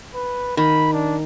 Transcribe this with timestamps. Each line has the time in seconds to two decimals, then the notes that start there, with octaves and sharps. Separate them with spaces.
0.15 B4
0.57 D#3 B5
0.93 D4